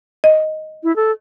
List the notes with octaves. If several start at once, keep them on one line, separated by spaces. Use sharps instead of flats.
D#5
E4
A4